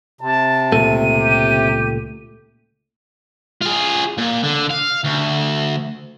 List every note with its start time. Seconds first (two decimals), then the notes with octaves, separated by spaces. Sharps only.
0.21 C3 A5
0.72 C#2 A#2 A3 D#7
1.15 G4
3.61 F4 G#4
4.18 A#2
4.43 D3
4.70 F5
5.04 D2